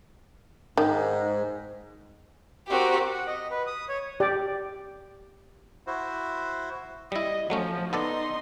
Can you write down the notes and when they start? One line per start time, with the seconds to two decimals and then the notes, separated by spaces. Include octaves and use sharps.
0.77 G#2 D#3
2.68 C4 F#4 G4 A#4
3.13 F#5
3.27 D#5
3.51 B4
3.67 D#6
3.89 C#5
4.20 G4 D5
5.87 E4 F#4 C5
7.12 G3 E4 D#5
7.50 F3 F#3 A3 C#4
7.93 B3 D#4 A4 D5 C6